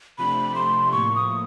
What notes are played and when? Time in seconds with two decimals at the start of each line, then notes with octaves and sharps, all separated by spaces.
0.18 C3 F3 A3 D4 G4 B5
0.55 C6
0.91 A2 F3 A#3 C#6
1.16 D#6